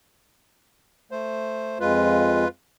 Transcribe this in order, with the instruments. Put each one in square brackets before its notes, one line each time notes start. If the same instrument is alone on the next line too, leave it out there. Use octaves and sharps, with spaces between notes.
[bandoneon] A3 C5
[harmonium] F2 G#3 [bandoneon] F4 B4